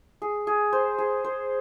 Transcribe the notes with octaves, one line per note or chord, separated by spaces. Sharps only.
G#4
G#4
C5
G#4
C5